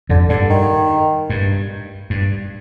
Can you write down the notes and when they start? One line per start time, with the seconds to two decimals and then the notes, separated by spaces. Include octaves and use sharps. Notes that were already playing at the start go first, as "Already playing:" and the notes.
0.09 F2 G#2 D3
0.29 G2 D3
0.50 D#3
1.30 G2
2.10 G2